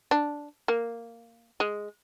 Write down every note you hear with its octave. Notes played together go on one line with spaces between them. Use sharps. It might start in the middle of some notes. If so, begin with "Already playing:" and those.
D4
A#3
G#3